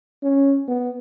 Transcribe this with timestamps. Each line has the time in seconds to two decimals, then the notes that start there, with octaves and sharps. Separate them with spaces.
0.23 C#4
0.68 B3